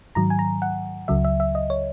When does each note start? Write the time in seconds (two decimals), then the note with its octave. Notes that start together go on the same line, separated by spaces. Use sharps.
0.15 G#2 D#3 F#3 A#5
0.30 G#5
0.39 A#5
0.62 F#5
1.08 C#2 C#3 F#3 E5
1.25 E5
1.40 E5
1.55 D#5
1.70 C#5